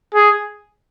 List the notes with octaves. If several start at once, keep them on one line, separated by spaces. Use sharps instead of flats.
G#4